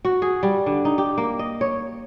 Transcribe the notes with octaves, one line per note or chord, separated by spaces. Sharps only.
F#4
G#4
G3
D3
D#4
G4
A#3
D#5
C#5